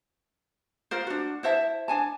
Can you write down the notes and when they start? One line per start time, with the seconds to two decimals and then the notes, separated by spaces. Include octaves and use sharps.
0.91 F4 A#4 C5
1.07 D4 F#4
1.43 E4 C5 E5 A5
1.88 D4 G#5 A5